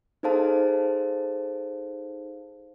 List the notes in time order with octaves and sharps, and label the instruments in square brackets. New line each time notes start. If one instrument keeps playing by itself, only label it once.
[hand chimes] D#4 G#4 A4 C5 F5 A5